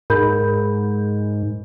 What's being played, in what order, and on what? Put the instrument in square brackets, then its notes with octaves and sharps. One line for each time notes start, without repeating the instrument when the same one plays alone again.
[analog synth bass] G#2 [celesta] A#4 B5 G6